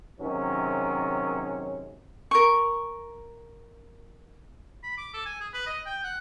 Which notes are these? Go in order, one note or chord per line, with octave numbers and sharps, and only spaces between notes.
C3 D#3 F#3 G#3 C#4
A#4 C#6
B5
D6
A4
G#5
G#4
B4
D#5
G5
F#5